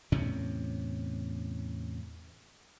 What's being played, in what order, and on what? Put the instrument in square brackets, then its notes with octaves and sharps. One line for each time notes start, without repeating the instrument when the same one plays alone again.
[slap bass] E2 A2 C3 C#4